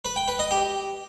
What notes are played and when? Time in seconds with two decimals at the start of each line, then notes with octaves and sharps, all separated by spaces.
0.05 B4
0.16 G5
0.28 B4
0.39 D#5
0.51 G4